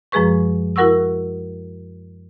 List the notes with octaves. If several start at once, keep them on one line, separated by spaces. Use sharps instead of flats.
F#2 F3 G#3 G#4 B4 C#6
E4 F#4 A#4 F#5 C#6 E6